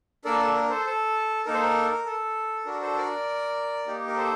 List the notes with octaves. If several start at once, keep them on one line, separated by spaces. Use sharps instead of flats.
A#3 D4 A4 A#4 D5
A4
A#4
A4 C5
A4
A#3 D#4 A4 A#4
C5
A#4
A4
D4 F#4 A4 A#4
A4 C5
A#4 D5
A#3 D#4 G4
A#4
A4 C5